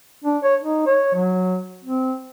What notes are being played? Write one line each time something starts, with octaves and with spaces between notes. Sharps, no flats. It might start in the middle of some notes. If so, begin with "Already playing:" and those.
D4
C#5
D#4
C#5
F#3
C4